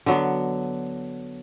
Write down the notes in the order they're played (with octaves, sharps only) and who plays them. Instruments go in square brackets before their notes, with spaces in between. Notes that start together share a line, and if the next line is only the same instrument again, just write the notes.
[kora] D3 F#3 B3